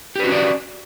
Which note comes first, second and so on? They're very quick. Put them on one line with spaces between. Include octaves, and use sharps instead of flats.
G4 B4 F#4 C#4 D5